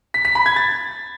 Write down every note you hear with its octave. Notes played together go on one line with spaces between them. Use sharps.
B6
B6
B5
G#6
A6